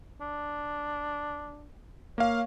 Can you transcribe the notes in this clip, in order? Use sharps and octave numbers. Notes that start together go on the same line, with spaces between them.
D4
A#3 C#5 F5